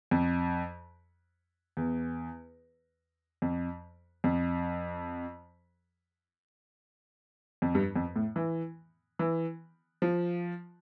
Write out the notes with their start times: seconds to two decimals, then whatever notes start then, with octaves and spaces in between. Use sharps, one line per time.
0.11 F2
1.77 E2
3.42 F2
4.24 F2
7.62 F2
7.75 G2
7.96 F2
8.16 A2
8.36 E3
9.19 E3
10.02 F3